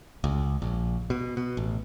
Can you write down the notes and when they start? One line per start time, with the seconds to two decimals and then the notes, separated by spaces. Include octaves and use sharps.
0.24 C#2
0.62 A#1
1.10 B2
1.37 B2
1.57 A1